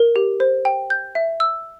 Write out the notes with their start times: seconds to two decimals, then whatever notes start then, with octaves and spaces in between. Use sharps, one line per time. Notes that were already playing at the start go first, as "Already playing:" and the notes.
Already playing: A#4
0.16 G4
0.40 C5
0.65 G5
0.90 G6
1.15 E5
1.40 E6